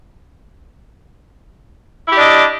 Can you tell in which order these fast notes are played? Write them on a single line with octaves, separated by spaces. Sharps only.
E4 G4 D5 D4 D#5